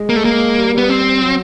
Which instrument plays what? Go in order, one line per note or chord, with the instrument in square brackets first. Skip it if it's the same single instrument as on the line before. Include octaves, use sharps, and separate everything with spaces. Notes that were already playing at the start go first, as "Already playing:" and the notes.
Already playing: [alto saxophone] G#3
[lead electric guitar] A#3
A3
A#3
[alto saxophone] G3
[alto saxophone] G3 [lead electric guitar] B3
[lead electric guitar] C4
[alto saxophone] F#3